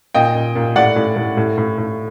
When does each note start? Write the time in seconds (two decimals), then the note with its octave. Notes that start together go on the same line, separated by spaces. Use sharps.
0.15 A#2 D#5 G5
0.35 A#2
0.55 A#2
0.76 A2 D5 F#5
0.96 A2
1.16 A2
1.37 A2
1.58 A2
1.78 A2